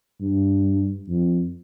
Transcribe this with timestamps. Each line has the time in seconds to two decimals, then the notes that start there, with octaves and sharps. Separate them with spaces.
0.21 G2
1.08 F2